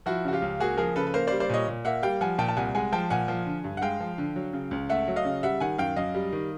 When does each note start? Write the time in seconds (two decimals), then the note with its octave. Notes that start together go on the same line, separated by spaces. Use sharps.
0.06 F3 E4 F#4
0.25 C#3 F#4
0.33 F4 G4
0.42 C#2
0.60 A#3 F#4 G#4
0.77 F3 G#4 A#4
0.96 C#3 A4 B4
1.07 B4
1.14 A#3 A#4 C5
1.27 C5 D5
1.32 G3
1.40 C5 D5
1.49 A#2 C#5 D#5
1.68 A#2
1.85 A#3 E5 F#5
2.03 G3 F5 G5
2.21 F3 F#5 G#5
2.38 A#2 G5 A5
2.48 A5
2.57 C2 F#5 G#5
2.75 G#3 F#5 G#5
2.92 F3 G5 A5
3.10 A#2 F#5 G#5
3.28 F3
3.46 D3
3.64 G2
3.77 F#5
3.82 G#3 F5 G5
4.00 F3
4.18 D3
4.36 F#3
4.53 C#3
4.71 C#2
4.89 A3 E5 F#5
5.08 F#3
5.16 D#5 F5
5.25 C#3
5.43 G3 E5 F#5
5.60 D#3 F#5 G#5
5.78 F#2 F5 G5
5.96 F#2 D#5 F5
6.14 G3
6.33 D#3